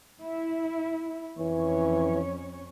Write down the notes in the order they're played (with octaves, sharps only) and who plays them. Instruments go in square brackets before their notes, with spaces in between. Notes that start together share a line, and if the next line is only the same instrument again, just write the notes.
[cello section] E4
[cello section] F2 C#4 C#5 [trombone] E3